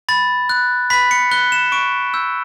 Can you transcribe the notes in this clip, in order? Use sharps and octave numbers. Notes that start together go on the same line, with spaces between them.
B5 A6
F#6
B5 B6
C#7
F#6 G7
E7
C#6 D7
E6 G6